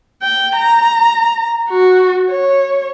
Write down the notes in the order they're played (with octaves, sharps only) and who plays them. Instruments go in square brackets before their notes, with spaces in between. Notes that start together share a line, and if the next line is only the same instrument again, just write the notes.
[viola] G5
A#5
F#4
C#5